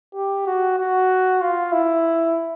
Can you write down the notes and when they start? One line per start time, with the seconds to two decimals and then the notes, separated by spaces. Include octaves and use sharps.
0.15 G4
0.47 F#4
0.78 F#4
1.41 F4
1.72 E4